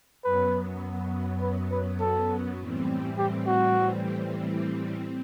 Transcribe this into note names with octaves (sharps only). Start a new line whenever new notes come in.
F#2 F#3 B3 B4
B4
B4
A4
A2 E3 G3 C4
G4
F#4
C4